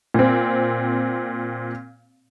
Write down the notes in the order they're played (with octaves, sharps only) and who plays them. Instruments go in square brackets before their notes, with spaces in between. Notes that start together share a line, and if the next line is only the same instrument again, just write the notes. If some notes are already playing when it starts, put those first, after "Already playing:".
[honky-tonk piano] A#2 C4